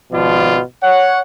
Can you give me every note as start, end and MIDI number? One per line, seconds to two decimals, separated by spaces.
0.12 0.60 32
0.12 0.60 47
0.12 0.60 53
0.12 0.60 65
0.12 0.60 74
0.83 1.19 73
0.83 1.19 78